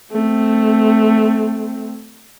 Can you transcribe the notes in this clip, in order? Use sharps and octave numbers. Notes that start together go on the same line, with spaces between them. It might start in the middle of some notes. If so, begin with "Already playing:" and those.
A3 C4